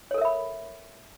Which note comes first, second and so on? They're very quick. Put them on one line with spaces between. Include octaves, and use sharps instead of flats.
C#5 A4 A#4 E5 B5